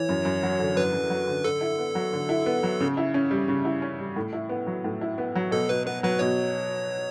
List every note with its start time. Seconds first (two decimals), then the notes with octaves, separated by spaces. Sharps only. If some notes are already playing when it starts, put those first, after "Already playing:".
Already playing: E3 C#5
0.09 F#2
0.25 F#2
0.43 F#3
0.59 D3
0.76 F#2 B4
0.93 F#2
1.10 F#3
1.27 D3
1.44 D3 A4
1.61 E4
1.78 B3
1.95 F#3
2.13 D3
2.29 E4
2.46 B3
2.63 F#3
2.80 C#3
2.97 E4
3.14 C#4
3.31 G3
3.48 C#3
3.65 E4
3.82 C#4
3.99 G3
4.16 A2
4.33 E4
4.49 B3
4.67 F#3
4.84 A2
5.01 E4
5.18 B3
5.35 F#3
5.51 B2 A4
5.69 B2 B4
5.86 B3 B4
6.03 F#3 B4
6.19 B2 C#5